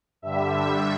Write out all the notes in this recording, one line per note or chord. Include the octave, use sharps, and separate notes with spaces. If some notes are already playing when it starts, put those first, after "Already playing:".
G2 D3 G3 E5